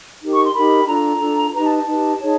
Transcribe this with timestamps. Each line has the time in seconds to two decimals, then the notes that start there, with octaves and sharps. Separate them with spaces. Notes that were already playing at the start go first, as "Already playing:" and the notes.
0.21 D#4 G4 A#4
0.32 C#6
0.43 C6
0.54 D#4 G4 A#4 B5
0.87 D4 F4 A4 A#5
1.20 D4 F4 A4
1.53 D#4 G4 B4 A#5
1.65 A5
1.75 A5
1.86 D#4 G4 B4
2.19 D#4 G#4 C#5